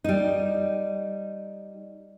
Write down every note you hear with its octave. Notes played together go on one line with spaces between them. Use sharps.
G3 D#4